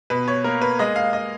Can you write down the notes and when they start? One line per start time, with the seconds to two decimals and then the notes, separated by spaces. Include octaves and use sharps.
0.10 B2 B4
0.28 C#5
0.44 A#3 A#4
0.61 B4
0.79 G#3 D#5
0.96 F5
1.13 D#5